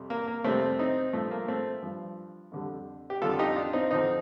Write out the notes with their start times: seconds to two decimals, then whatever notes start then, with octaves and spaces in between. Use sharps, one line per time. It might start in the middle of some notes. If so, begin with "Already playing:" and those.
Already playing: F2 C3 G3
0.10 A#3
0.27 A#3
0.44 F2 C3 G3 A3 C4
0.79 C4 D#4
1.13 G2 F3 A3
1.31 A#3
1.48 A3 C4
1.83 G2 F3
2.52 F2 D3 G3
3.10 G4
3.21 F2 D3 G3 F4 A4
3.39 D#4 G4
3.55 D4 F4
3.73 C4 D#4
3.90 F2 D3 F3 C4 D#4